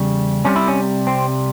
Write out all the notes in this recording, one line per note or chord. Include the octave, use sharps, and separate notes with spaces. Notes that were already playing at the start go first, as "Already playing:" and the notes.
Already playing: E2 C#3 G3
C2 C3 G3 C#4
E4
C#4
C4